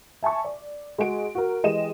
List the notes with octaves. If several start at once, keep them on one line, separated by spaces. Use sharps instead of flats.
E5 G#5 A5 C#6
D5
G#3 F#4 G#4 D7
F#4 A#4
E3 G#3 G4 D#5 D#7 E7